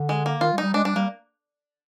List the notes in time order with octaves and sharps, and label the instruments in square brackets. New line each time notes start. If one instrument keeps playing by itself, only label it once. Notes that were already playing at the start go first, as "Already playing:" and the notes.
Already playing: [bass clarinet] D3
[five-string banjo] G#3
A#3
[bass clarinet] D#3 [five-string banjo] F4
[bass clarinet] G3
[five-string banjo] D#4
[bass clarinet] G3
[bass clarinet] G#3 [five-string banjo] D4
[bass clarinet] G3 [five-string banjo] D4
[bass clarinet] G3 [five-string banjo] A#3